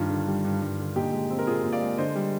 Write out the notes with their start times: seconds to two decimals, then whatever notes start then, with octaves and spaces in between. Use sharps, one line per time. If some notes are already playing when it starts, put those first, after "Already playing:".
Already playing: G2 D#3 F4
0.10 D3
0.28 G3
0.45 G2
0.62 G2
0.79 D3
0.96 A#2 D#4 G4
1.13 G#3
1.30 C4
1.39 A#4
1.47 A#2 F4 G#4
1.64 A#2
1.72 D5 F5
1.82 G#3
1.98 D3 C5 D#5
2.15 G3